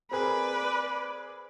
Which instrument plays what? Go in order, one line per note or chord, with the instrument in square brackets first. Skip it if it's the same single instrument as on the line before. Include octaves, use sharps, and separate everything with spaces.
[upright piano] C4 G#4 A#4 [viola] B4 D5